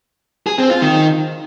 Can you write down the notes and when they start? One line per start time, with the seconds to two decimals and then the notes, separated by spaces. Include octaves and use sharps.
0.47 G#4
0.58 C4
0.70 F4
0.82 D#3